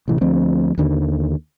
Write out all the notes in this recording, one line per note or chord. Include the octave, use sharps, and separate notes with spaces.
A1 C3 E3
D2 F3 C4
D#2 D3 D#3